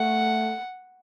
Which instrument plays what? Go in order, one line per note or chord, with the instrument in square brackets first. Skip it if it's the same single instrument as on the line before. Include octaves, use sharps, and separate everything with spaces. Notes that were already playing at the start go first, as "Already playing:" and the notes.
Already playing: [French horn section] A3 [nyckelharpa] F#5